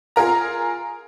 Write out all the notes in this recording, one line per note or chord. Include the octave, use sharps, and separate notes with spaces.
F4 G#4 A#4 A#5